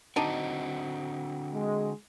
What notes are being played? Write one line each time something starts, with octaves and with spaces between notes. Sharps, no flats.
D3 C4 D4 D#4 F#4
G#3